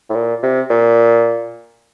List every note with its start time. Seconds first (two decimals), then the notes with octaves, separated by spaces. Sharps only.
0.10 A2
0.15 A#2
0.43 C3
0.70 A#2